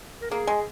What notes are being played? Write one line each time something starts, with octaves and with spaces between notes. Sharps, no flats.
A#4
A#3 G#4
G#3